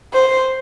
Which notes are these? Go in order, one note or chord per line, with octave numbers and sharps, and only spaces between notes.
C5